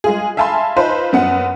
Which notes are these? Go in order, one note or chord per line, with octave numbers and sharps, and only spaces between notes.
G#3 F4 G#4
E5 F5 G#5 A5 B5 C6
D#4 F4 B4 C5
F#2 B3 F#5